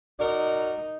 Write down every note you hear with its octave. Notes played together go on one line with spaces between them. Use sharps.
D#4 F#4 A#4 D5